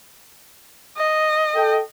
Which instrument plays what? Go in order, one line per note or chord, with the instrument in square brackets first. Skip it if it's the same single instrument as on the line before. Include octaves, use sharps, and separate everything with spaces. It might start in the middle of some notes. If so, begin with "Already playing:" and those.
[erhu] D#5
[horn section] A4 G5